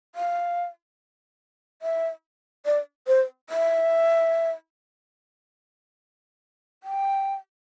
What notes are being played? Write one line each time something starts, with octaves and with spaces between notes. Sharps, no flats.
F5
E5
D5
C5
E5
G5